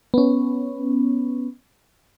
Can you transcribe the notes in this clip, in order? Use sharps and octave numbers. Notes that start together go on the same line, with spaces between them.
B3 C#4